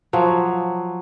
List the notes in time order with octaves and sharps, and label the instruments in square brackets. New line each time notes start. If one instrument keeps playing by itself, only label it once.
[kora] F3 F#3